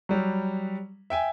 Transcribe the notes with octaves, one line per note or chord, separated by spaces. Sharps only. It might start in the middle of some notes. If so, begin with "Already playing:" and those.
F#3 G3
E5 G5 G#5